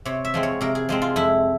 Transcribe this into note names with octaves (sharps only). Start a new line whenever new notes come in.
C3 C#5
E5
F3 G#3 C4
C#5
C3 A#4
G#4
F3 G#3 C4
F4
F2 E4